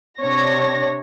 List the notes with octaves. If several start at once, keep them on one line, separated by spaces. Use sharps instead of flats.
C3 D4 C#5 A#6